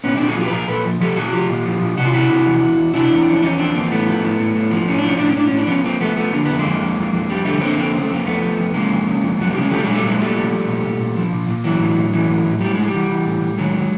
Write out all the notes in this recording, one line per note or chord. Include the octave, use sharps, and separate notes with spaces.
A#2 B3 C#4
A#2 C4 D4
F#4 G#4
F3 F4 G4
B4
A#2 G#4 A#4
A#2 A4 B4
F3
F3 G4 A4
A#2 F#4 G#4
F3 F4 G4
A#2
F3
A#2
C3 F#4
F4
C3 E4 F#4
C3
E2
E2
E2
C3 D4 E4
E2 B3
C4
F3 C#4
D4
E2 C#4 D#4
F3 C4 D4
E2 A#3 C4
A2 A3 B3
F3
A2
A2
A2
F3
A2 C#4
D4
F3 C#4
A2 D4
C#4
A2 D4
A2 C#4
D4
F3 B3 C#4
F3 A#3 C4
F3 A3 B3
F3 A3 B3
D3 A#3
F2 B3
G#3 A#3
F2
F2
F2
F2
F2 G3
D3 G3 A3
D3 A#3 C4
F2 A#3 C4
C#3
A3
F2 A#3
F2 A3 B3
F3
F2
C#3 G#3 A#3
F2
C#3
F2
F2 F#3
C#3 G3
G#3
F3 G3 A3
A#2 F#3 G#3
G3 A3
A#2 F#3 G#3
A#2 G3 A3
F3
F3
A#2
A#2
A#2
F3
A#2
A#2
E3 F#3
A2
A2
E3
A2
A2
A2 G3
A2 G#3
G3
E3
E3
A2
A2
D#3 F#3 G#3
D#3